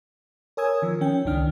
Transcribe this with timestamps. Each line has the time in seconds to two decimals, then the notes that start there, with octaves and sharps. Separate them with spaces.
0.57 A#4 C#5 G#5 D#6 E6 G#6
0.82 D#3 F3
1.01 C#4 G5
1.25 C#2 G2 D#3 D4 F6